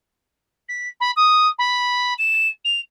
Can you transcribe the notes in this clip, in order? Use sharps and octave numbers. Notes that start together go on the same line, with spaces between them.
B6
B5
D#6
B5
E7
F7